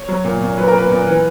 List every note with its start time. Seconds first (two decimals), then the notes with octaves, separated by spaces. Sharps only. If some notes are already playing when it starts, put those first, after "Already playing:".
Already playing: C#5
0.08 F#3
0.24 A#2
0.41 A#2
0.57 F#3 B4
0.68 A#4
0.74 A#2 B4
0.90 A#2
1.07 E3